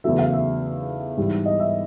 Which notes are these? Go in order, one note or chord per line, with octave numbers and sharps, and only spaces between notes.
E2 C#3 F#3 A3 E5
F5
E5
G#2 E3 G3
D#5
E5